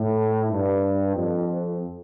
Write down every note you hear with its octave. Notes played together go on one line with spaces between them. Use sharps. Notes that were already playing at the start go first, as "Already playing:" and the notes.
Already playing: A2
G2
F2